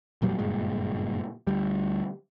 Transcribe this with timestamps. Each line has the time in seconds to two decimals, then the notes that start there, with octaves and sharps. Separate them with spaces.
0.22 E1 A#2 F#3 G3
0.39 F#1 G2 A#2 G#3
1.47 D2 G3